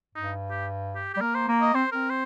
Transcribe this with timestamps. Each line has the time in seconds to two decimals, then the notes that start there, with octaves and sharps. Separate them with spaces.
0.15 G2 D#4
0.50 G4
0.95 G4
1.13 G4
1.16 G3
1.21 A#3 A#4
1.34 C5
1.48 A#3
1.61 D#5
1.74 C4 C5
1.92 C4 A#4
2.10 C5